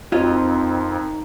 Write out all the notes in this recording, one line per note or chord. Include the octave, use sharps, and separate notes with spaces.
F2 C4 D#4 F4 A#4 C#5 D#5 A#5